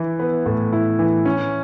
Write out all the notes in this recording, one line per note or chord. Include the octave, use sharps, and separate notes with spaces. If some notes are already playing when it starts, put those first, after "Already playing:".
Already playing: E3 E4
B3
A2
E4
E3
C#4